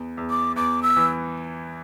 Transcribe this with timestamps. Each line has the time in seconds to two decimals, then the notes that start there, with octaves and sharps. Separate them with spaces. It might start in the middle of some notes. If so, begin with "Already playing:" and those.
Already playing: E2
0.17 E2
0.30 D6
0.56 E2 D6
0.83 E6
0.97 E3